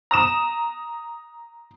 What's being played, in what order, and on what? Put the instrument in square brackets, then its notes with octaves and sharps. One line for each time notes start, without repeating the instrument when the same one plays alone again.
[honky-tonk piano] A#5 D#6 E7